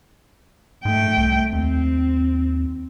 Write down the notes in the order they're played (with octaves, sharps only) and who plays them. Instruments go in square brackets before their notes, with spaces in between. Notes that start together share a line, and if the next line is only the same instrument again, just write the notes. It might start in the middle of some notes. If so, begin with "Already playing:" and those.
[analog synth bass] G#2 [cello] A3 G5
[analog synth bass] C2
[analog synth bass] D#2 [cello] C4